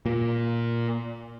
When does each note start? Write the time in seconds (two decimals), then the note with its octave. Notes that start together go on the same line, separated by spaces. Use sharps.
0.06 A#2